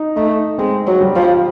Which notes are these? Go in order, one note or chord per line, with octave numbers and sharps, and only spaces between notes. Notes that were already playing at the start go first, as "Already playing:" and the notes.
Already playing: D#4
A3 D#4
G#3 C4
F#3
G3
F3